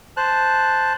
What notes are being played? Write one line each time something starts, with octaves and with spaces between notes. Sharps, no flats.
C5 A5 F#6